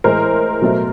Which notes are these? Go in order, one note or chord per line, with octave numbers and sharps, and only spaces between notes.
A2 E3 G#3 A#4 C5
B2 F#3 A3